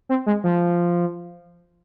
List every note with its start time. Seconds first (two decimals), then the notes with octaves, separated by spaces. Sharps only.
0.09 C4
0.26 G#3
0.44 F3